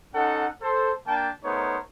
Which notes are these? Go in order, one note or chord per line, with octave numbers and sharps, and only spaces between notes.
C#4 D#4 A4 F#5
A4 C5
A#3 D4 G5 A5
A3 B3 D#4 A#4 C5 C#5